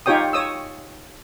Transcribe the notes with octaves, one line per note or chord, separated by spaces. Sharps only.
D#4 F4 G4 C#5 G5 D#6
C#5 D#6 E6